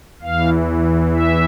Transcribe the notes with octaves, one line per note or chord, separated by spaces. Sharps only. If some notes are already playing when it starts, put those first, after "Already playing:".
E2 E3 F5
E5